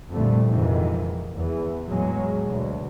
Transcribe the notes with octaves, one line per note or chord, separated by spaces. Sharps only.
C2 F2 A#2 D3 G3 A3
F2 G#2 C3 D#3 E3
E2 E3
E2 A2 F#3 G#3
D2 B2